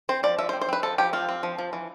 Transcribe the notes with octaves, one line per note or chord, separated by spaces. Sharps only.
C4 C5
F3 D5
F3 E5
C5
C4
C5
C4 B4
F3 A4
F3 G4
C4 F4
C4
F3
F3
E3